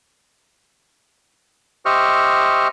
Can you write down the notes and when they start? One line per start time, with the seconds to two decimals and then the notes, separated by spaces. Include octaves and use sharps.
1.85 G4 C5 D#5 E5 C#6 F6